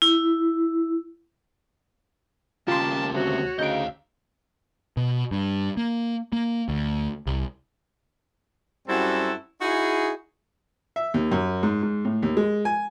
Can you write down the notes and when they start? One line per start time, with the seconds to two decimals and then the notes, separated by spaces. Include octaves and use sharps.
0.02 E4
2.68 D#2 C#3 F4 G4 A#4 A5 C6
3.12 D2 C3 F#4 C#5
3.59 D2 C#3 D#4 D#5 F5 G6 D7
4.97 B2
5.31 G2
5.77 A#3
6.33 A#3
6.69 D2
7.27 C2
8.87 F#2 G3 C4 E4 F#4 A4
9.61 D#4 E4 F#4 G#4
10.96 E5
11.14 D#2
11.31 F#2
11.63 G#2
11.82 G#2
12.05 A2
12.22 D#2
12.37 G#3
12.65 G#5